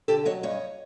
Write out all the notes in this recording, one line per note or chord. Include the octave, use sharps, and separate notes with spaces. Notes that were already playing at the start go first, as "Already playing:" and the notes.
D3 G4 A4
F#3 C#5 D#5
G2 C#5 D#5